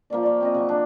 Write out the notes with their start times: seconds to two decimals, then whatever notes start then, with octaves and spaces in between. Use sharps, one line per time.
0.10 F3 A#3 C#4 D5
0.23 C#5 D5
0.41 C4 C#4 D#5
0.54 C#3 F#3 C#6
0.69 D4